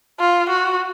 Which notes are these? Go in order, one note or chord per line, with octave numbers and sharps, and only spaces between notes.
F4
F#4